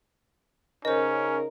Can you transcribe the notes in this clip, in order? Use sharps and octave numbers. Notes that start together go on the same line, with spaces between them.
C#3 C#4 D#4 A#4 C5 D#5